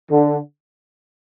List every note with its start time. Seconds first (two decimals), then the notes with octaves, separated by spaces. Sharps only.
0.11 D3